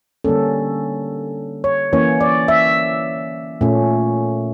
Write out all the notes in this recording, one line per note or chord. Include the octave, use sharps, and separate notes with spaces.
D3 G3 A#3 C#4 A4
C#5
E3 A#3 C#4 C#5
D5
E5
A#2 A3 C#4